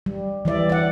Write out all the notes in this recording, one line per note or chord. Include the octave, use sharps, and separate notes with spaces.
G3
E3 G3 D5 E5
D5 F#5